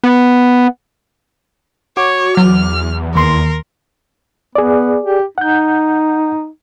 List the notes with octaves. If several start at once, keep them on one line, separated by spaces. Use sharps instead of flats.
B3
F#4 C#5 D6
E2 F#3 F6
D#2 A#4 C6
B3 G#4 D5
G4
D#4 F#5 G6